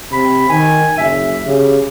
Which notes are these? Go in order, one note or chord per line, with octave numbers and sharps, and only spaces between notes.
C3 B5
D#3 G#5
F#1 E5
C#3 G4